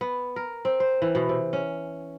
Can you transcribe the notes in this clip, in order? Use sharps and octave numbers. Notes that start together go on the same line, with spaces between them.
B3
A#4
C4
C5
E3
B2
C3
C#4